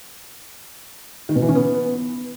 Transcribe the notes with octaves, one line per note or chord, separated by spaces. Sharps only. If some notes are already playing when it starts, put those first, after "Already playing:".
D#3
B2
E3
C#4
B3